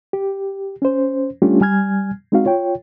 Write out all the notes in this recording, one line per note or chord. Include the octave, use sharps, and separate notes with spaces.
G4
C#4 C5
G3 A3 C#4 D4 F4 G4
G3 G#5 F6 G#6
G#3 C4 D#4 F#4 F5
F4 C#5 G5